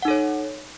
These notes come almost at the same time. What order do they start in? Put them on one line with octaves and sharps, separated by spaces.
F#5 D#4 A4 C#5